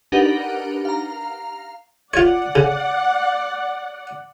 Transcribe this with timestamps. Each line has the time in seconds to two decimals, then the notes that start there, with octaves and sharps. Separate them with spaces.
0.12 D4 D#4 G4 A#4 B4 F#5
0.85 F5 A#5
2.14 F4 C#5 D5 F#5
2.55 C#3